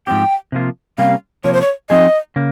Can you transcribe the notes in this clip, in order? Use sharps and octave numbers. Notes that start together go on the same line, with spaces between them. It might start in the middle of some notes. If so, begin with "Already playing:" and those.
G#2 F3 C4 G4 G5
C3 F3 A#3 F4
C3 G3 A#3 C#4 F5
C3 F3 A#3 C#5
C5
C#5
F3 C4 D#4 G#4 D#5
C#3 A#3